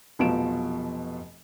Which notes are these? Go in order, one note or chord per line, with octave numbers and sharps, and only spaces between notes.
F1 B2 F3 F#3 D7 E7